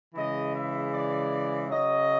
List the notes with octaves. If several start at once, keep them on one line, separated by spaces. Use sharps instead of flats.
C#3 E3 G#3 D#5
E5
D5
C#3 F#3 D#5